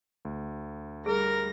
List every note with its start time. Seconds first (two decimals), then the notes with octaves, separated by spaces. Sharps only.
0.25 D2
1.06 G3 G#4 A#4 A#6